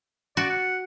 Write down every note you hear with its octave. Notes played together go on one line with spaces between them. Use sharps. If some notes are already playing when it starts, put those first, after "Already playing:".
F#4 D5
F#5